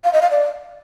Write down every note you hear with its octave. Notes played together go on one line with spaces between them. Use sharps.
F5
D#5
F5
D5